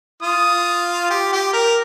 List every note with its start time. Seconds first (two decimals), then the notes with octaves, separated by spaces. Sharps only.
0.22 F4 D#6
1.10 G4
1.32 G4
1.53 A#4